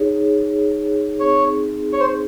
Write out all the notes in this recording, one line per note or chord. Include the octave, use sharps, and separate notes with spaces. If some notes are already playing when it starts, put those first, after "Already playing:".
Already playing: D#4 G#4 C#5
C4 D#4 G#4 C#5
C#5
C5